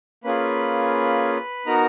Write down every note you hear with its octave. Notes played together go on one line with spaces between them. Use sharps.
A#3 C#4 F4 G#4 B4 B5
B3 D#4 F#4 A#4 A#5